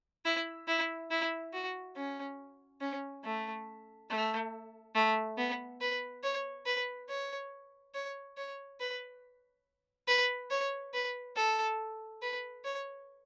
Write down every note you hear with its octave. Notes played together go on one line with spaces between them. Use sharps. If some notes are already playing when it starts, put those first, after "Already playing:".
E4
E4
E4
F#4
C#4
C#4
A3
A3
A3
B3
B4
C#5
B4
C#5
C#5
C#5
B4
B4
C#5
B4
A4
B4
C#5